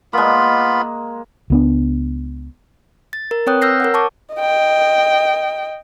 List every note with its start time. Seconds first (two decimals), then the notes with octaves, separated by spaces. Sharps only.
0.13 G#3 A#3 B3 F4 B5
1.50 C#2 B3 D4
3.13 A6
3.31 A#4
3.47 C4 B4 C#5 G5 D#6 F#6
3.62 E6 F6 G6 A#6 C7
3.80 A#4 C#5 F#5
3.94 A5 C#6 D6
4.35 D#5 G5